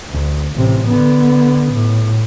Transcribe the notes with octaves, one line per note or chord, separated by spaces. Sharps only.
D2
A1 C3
D3 B3
A2